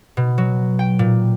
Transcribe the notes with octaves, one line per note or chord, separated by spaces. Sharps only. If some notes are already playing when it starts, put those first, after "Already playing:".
B2
F#3
G5
A#2